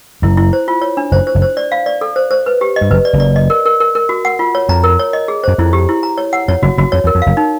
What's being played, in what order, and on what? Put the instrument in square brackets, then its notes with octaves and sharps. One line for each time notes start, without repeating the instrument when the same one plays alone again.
[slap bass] F#1 F#2 [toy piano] E4
[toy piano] E4
C5
F4
C#5
D4
[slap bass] F#1 F#2 [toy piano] C5
[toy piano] C5
[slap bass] F#1 F#2
[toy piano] C5
D5
F5
D5
A4
C5
C5
B4
G4
D#5
[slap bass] G2
[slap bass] F#1 F#2 [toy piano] B4
[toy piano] D5
[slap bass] F#1 F#2
[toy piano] D5
D#5
A#4
A#4
A#4
A#4
F#4
F#5
F4
C#5
[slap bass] F2 [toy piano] A#5
[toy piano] A#4
C#5
D#5
G#4
[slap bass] F#2 [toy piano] C5
[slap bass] F2 [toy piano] E4
[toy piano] G4
E4
A#5
C#5
F#5
[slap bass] F2 [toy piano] C#5
[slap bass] F#1 F#2 [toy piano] F#4
[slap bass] F#1 F#2 [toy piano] F#4
[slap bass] F2 [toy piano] C#5
[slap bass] E2
[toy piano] A#4
[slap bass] F2
[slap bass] F#1 F#2 [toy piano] F5
[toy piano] D#4